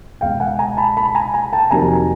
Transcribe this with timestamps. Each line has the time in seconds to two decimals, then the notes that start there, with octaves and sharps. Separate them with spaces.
0.21 C#2 B2 G#3 F5 G5
0.40 F#5 G#5
0.59 G#5 A#5
0.77 A5 B5
0.97 A5 B5
1.15 G#5 A#5
1.34 G#5 A#5
1.53 G5 A5
1.71 F2 C3 D#3 F#3 A#3 G#5 A#5